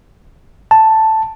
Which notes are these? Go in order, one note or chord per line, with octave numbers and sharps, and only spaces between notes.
A5